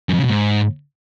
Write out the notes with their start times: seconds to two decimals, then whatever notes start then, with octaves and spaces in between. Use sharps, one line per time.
0.09 F#2
0.14 F2
0.19 C#3
0.24 B2
0.29 G#2